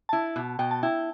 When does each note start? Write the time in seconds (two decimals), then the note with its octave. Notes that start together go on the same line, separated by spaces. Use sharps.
0.09 E4 A5
0.36 B2
0.59 B2 G5
0.71 A5
0.83 E4 G5